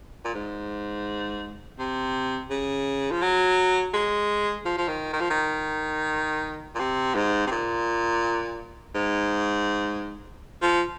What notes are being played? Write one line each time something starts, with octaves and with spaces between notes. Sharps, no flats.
A#2
G#2
C3
C#3
F3
F#3
G#3
F3
F3
D#3
D#3
F3
D#3
A#2
C3
G#2
C3
A#2
G#2
F3